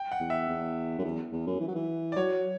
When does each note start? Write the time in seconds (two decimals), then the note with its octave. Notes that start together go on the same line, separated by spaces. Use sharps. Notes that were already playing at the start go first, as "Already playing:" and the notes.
Already playing: G5
0.12 F#5
0.20 E2
0.30 E5
0.49 E2
0.99 F#2
1.04 E2
1.32 E2
1.47 F#2
1.60 E3
1.68 F#3
1.75 E3
2.12 D5
2.16 F#3 C#5